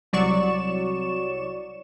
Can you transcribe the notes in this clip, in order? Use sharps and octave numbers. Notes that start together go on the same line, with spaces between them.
C2 F#3 D5 C#6 E7